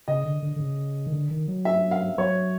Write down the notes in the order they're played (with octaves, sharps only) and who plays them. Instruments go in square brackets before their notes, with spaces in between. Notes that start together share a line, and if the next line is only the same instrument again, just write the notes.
[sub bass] C#3 [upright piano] D#5
[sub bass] D3
D3
D3
C#3
D#3
D3
D#3
F#3
[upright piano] E5
F5
[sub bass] F#3 [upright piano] C#5